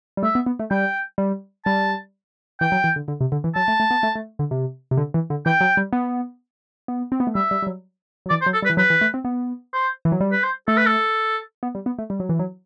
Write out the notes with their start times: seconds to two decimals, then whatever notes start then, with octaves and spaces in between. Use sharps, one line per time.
0.17 G3
0.23 A3 E5
0.35 B3
0.46 B3
0.60 A3
0.71 G3 G5
1.18 G3
1.66 G3 A5
2.61 E3 G5
2.72 F#3
2.84 E3
2.96 D3
3.08 D3
3.21 C3
3.32 D3
3.44 E3
3.56 F#3 A5
3.68 A3
3.80 A3
3.91 B3
4.03 A3
4.15 A3
4.39 D3
4.51 C3
4.91 C3
4.97 D3
5.14 E3
5.30 D3
5.46 E3 G5
5.61 F#3
5.77 G3
5.93 B3
6.88 B3
7.12 C4
7.20 B3
7.27 A3
7.35 G3 E5
7.51 G3
7.62 G3
7.67 F#3
8.26 F#3
8.30 E3 D5
8.41 C5
8.46 F#3
8.54 A4
8.62 G3
8.65 B4
8.70 E3
8.77 F#3 B4
8.90 E3
9.01 A3
9.14 C4
9.25 B3
9.73 C5
10.05 E3
10.12 F#3
10.20 G3
10.32 B4
10.43 C5
10.68 A3 A4
10.77 B4
10.86 A4
11.63 B3
11.75 G3
11.86 B3
11.99 A3
12.10 G3
12.20 F#3
12.29 E3
12.39 F#3